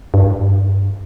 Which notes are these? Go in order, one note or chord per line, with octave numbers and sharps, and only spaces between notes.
G2